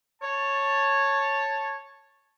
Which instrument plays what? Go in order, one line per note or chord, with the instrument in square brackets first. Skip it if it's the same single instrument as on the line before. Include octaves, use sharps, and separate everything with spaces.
[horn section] C#5 A5